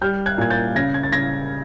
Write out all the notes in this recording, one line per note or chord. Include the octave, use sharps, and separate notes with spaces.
G3 F6 G6
F#6 G#6
A#2 G#6
G6 A6
C#3 G#6 A#6
G#6
A6
C#3 G#6 A#6